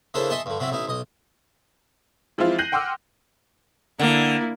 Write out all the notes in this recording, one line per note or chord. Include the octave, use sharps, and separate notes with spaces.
C#3 A#3 D4 E4 A4 C5
D#5 E5 G#5 A5 C6 C#6
G2 D3
C3 F#3 C4 E4
A1 D#4 E4
B1 D#5
E3 F3 G#3 C4 E4 F4
F#6 G6 A#6 C7 D#7 F#7
F#5 G5 C6 D6 E6 F6
D3 A#3 E4